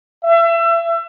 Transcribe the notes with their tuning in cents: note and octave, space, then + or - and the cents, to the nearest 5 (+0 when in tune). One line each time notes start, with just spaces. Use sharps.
E5 +30